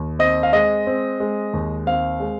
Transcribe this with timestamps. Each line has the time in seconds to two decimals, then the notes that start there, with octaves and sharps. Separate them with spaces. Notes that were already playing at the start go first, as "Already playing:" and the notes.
Already playing: D#2
0.19 C4 D#5
0.43 F5
0.53 G#3 D#5
0.87 C4
1.20 G#3
1.53 D#2
1.87 C4 F5
2.20 G#3